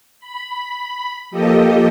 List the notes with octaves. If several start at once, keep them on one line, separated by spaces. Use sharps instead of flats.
B5
F3 A#3 G4 A4 D#5